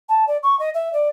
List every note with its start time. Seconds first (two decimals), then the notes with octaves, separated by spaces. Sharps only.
0.09 A5
0.27 D5
0.43 C#6
0.60 D#5
0.74 E5
0.93 D5